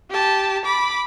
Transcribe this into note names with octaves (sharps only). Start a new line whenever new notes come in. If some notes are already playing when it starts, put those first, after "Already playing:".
G4 A5
B5 D6